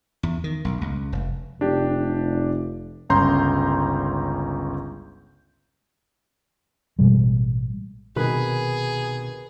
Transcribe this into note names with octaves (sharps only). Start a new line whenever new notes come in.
E2
D#3
B1
C#2
F1
F1 D4 G4
G1 C#2 C#4 A#5 C6 G6
A1 B2 G3 G#3
C2 B2 D#3 G#4 A#4 B4